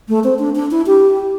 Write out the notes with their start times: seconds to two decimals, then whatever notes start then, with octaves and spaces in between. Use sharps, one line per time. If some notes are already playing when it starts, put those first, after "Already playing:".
0.09 A3
0.24 C4
0.39 D4
0.55 D4
0.71 E4
0.86 G4